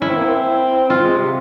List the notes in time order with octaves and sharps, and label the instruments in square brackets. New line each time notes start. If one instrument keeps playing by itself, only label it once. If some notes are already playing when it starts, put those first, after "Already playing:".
[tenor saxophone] C#4 [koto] E4
[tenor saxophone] C4
A#3
C4
[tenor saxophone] C4 [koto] F4
[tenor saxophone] G#3
C3